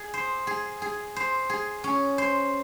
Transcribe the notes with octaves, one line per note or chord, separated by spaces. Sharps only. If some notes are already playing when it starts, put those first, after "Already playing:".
Already playing: G#4
C5
G#4
G#4
C5
G#4
C#4
C5